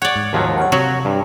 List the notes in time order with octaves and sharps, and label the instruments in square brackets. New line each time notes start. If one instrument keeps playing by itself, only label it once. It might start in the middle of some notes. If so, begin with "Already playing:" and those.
[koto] C#5 D5 [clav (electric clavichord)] F#5
[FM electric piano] G#2
[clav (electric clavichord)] D#2 F3 F#3
[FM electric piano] C#5 F5 F#5
[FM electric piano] C3 [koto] F#3 [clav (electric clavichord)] F#4 C#5
[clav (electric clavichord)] G2